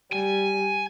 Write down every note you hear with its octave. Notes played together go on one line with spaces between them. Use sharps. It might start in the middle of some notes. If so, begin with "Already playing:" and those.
G3 G#5